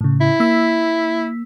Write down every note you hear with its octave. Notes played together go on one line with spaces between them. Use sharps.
A2 C#3
E4
A#3 E6 B6